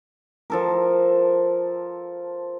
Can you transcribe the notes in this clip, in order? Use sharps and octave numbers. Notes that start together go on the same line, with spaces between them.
F3 A4 A#4